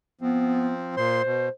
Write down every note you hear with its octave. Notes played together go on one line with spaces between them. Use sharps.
F3 B3 C4
A#2 C5 C6
B2